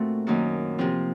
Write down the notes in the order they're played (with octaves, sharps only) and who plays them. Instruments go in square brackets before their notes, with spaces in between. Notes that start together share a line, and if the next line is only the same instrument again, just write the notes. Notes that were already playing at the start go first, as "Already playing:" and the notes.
Already playing: [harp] A#2 A3 C4 F#4
F#2 D#3 A#3 D#4 F#4
C3 F3 C4 F4